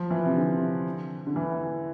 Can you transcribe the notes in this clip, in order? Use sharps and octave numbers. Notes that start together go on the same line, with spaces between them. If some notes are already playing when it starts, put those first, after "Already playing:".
Already playing: F3
E3
C3
D3
D3
E3